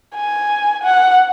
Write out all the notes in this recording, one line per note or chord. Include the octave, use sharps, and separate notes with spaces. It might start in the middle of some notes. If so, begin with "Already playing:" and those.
G#5
F#5